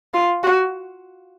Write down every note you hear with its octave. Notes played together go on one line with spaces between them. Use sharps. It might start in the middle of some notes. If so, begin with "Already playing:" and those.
F4
F#4